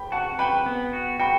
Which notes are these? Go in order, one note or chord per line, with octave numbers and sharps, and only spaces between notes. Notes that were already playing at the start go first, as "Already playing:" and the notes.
Already playing: G5 B5
F#4 F#5 A5
B4 G5 B5
B3
F#4
F#4 G5 B5